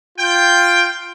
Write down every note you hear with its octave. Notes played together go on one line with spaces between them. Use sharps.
F4 G5